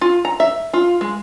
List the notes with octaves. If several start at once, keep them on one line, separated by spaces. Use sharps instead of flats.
F4
A#5
E5
F4
G#3